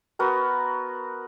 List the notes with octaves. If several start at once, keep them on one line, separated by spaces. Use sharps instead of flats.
B3 F#4 A#4 C6